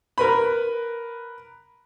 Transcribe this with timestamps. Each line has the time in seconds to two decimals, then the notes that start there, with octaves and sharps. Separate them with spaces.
0.18 A#4 B4 B5